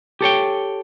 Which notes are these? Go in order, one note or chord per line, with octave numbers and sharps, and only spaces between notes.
G4 A4 C#5 G5